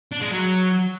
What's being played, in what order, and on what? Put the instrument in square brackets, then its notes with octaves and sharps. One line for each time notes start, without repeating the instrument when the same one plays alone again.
[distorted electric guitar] D4
G#3
F#3